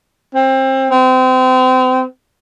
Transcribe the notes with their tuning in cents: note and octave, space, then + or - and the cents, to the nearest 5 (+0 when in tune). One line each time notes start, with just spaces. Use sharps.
C4 +25
C4 -30